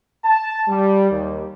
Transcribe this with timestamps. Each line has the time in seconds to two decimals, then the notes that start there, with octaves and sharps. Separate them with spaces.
0.24 A5
0.68 G3
1.11 D#2